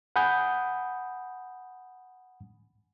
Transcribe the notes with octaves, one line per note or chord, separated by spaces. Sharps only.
F#5 G#5 B5 D#6 G6